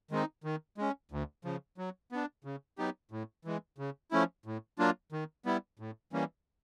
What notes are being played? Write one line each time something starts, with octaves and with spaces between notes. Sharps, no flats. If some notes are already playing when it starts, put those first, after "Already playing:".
D#3 G#3 C4 D#4
D#3
G#3 C#4
D2
C#3 F3
F#3
B3 D4
C#3
F#3 B3 D#4 G4
A2
E3 G#3
C#3
F3 A3 C#4 E4
A2
F#3 A#3 D4 F4
D#3
G3 B3 E4
A2
E3 G3 A#3 C#4